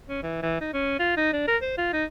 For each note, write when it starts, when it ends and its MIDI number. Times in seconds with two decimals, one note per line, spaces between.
0.09 0.22 61
0.23 0.42 52
0.42 0.59 52
0.61 0.69 63
0.73 0.98 61
0.99 1.14 65
1.17 1.30 63
1.33 1.44 62
1.48 1.57 70
1.62 1.77 72
1.78 1.89 65
1.93 2.04 63